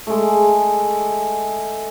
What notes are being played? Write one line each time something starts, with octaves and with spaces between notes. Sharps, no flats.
G#3 A3